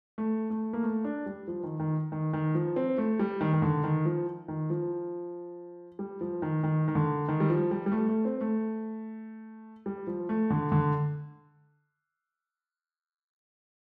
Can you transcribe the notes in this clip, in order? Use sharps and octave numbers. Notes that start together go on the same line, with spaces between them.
A3
A3
A#3
A3
D4
G3
F3
D#3
D#3
D#3
D#3
F3
C4
A3
G3
D#3
D#3
D3
D#3
F3
D#3
F3
G3
F3
D#3
D#3
D#3
D3
D#3
G3
F3
G3
G3
A3
A3
C4
A3
G3
F3
A3
D3
D3